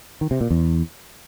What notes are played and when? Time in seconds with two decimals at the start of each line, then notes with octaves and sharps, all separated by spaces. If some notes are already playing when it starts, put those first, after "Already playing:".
0.21 D#3
0.31 C3
0.41 A#2
0.50 E2